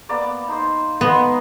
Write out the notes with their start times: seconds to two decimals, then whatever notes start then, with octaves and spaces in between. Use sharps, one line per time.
0.09 A#3 B3 D5
0.48 D#4 C5
1.01 B3 D#5 C6